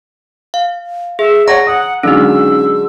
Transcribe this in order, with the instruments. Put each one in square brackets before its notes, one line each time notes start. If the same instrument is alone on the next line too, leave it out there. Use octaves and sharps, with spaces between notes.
[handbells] F5
[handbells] G#4 [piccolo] E5
[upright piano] C#5 F#5 [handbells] A#5 [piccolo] A#6
[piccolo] F#5 [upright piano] D#6
[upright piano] D3 F#3 G#3 [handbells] C#4 D#4 [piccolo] E6